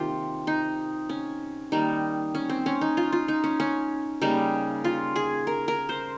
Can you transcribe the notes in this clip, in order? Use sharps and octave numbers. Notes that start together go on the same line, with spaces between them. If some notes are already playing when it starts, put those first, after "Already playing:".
Already playing: C3 D#3 A#3 F4 G4
D#4
C#4
D#3 G3 A#3 D#4
C#4
C4
C#4
D#4
F4
F4
D#4
C#4
C#4
C#3 G3 A#3 D#4
F4
G#4
A#4
A#4
C5